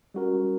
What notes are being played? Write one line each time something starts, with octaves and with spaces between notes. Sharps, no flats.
G3 C#4 F#4 A#4